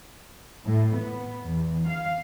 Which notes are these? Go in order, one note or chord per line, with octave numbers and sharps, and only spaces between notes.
A2
B3
E2
F5